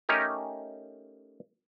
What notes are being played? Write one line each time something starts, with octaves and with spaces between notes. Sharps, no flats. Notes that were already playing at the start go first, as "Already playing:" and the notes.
A3 C#4 D#4 G4 A#4